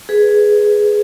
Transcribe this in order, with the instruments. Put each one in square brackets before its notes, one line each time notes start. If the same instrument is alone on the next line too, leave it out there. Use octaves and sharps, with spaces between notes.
[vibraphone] G#4 B4